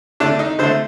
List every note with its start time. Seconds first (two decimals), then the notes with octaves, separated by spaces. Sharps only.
0.20 D3 A3 D4
0.39 D#4
0.59 D3 A3 C5